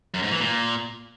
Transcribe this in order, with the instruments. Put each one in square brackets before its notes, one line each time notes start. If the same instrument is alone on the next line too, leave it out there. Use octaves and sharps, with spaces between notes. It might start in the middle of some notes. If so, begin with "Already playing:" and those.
[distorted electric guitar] F#2
G#2
E3
A#2